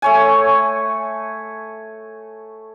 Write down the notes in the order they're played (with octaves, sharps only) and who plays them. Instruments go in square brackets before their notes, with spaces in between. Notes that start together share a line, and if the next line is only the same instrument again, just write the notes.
[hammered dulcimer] A3 C#5 G#5